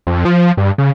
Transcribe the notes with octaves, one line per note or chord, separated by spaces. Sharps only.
F2
F3
G2
C#3